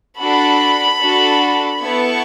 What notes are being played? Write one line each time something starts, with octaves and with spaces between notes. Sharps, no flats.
D4 F#4 A4 B5
D4 F#4 A4
B3 E4 A4 C#6